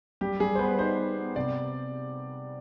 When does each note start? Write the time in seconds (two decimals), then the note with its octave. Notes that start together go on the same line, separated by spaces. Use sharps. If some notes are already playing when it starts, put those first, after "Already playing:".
0.21 G3 G4
0.40 G3 G#4
0.55 C5
0.59 B3 B4
0.79 D#4 C5
0.98 B3
1.17 B3
1.36 C3 D5